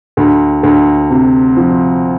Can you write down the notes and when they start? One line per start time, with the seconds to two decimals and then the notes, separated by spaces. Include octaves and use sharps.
0.17 D2
0.63 D2
1.11 C3
1.57 F3